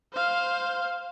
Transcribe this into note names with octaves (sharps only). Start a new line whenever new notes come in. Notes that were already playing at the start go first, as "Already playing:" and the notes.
C5 F5